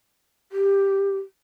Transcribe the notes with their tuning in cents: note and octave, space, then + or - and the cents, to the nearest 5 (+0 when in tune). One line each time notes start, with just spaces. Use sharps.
G4 +10